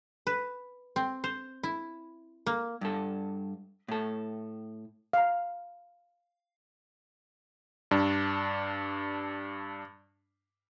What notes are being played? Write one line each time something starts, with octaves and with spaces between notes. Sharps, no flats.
B4
C4
C5
E4
A#3
G2 A4
A2 A4
F5 A#5
G2 D4